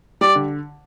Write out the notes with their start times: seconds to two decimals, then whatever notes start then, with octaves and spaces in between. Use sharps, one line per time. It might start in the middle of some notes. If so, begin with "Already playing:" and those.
0.21 G3 D5
0.35 D3